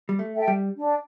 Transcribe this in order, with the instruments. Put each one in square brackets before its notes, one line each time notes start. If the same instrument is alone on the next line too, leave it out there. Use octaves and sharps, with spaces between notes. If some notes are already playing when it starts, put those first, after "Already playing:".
[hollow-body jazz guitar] G3
A3
[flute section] A4 E5 G5
[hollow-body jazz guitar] G3
[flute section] D4